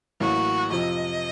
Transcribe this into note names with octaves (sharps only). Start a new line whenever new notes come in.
A1 A2 F#3 A#3 F#4
F2 C3 F3 D#5